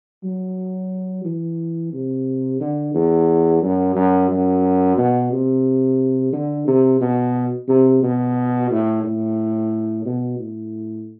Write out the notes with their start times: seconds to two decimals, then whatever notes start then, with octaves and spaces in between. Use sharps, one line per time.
0.23 F#3
1.25 E3
1.93 C3
2.60 D3
2.94 E2
3.62 F#2
3.95 F#2
4.30 F#2
4.97 B2
5.32 C3
6.33 D3
6.67 C3
7.01 B2
7.68 C3
8.02 B2
8.70 A2
9.04 A2
10.05 B2
10.39 A2